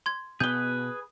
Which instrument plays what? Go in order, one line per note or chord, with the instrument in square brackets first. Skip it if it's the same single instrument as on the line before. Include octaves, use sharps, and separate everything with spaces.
[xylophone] C6 G#6
[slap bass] B2 B3 [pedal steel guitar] G#4 B4 [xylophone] G6 G7